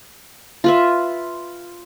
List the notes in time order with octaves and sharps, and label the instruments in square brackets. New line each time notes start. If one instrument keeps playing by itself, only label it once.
[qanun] F4 B4 E5